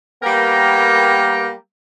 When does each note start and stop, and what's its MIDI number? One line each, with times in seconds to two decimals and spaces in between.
0.23 1.50 55
0.23 1.50 58
0.23 1.50 59
0.23 1.50 70
0.23 1.50 79
0.23 1.50 82